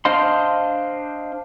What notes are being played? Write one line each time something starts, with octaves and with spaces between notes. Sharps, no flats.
D4 C5 D#5 F5 C6